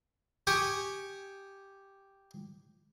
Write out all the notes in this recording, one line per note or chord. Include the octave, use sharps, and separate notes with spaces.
G4 G5 G#5 C#6 D#6